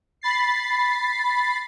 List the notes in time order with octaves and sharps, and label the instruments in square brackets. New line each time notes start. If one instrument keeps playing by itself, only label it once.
[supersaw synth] B5 A6 C7